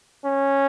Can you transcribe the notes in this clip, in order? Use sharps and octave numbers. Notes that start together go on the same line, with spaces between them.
C#4